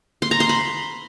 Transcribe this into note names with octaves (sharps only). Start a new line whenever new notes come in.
C6
A#5
C6
B5